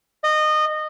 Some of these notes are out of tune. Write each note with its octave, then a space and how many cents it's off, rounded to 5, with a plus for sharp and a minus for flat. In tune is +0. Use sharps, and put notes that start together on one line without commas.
D#5 -20